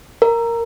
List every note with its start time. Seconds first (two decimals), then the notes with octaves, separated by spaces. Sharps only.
0.22 A#4